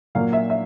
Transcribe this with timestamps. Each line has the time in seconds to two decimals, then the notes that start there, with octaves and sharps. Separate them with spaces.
0.15 A#2 F#3 A#3 F5
0.33 E5
0.50 E5